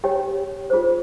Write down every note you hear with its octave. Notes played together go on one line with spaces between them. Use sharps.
G4 C#5 G5
F4 G#4 C5